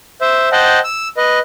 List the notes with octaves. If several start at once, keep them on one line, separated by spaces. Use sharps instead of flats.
C5 E5
C5 D#5 F#5 G5 A5
E6
B4 D#5